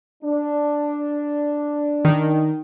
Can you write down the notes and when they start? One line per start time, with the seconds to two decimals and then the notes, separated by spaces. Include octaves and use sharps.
0.24 D4
2.05 D#3